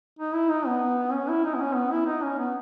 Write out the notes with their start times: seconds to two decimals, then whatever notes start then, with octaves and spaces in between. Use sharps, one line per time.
0.19 D#4
0.34 E4
0.50 D#4
0.66 B3
1.13 C#4
1.28 E4
1.45 D#4
1.55 B3
1.61 C#4
1.75 B3
1.91 E4
2.06 D#4
2.23 C#4
2.38 B3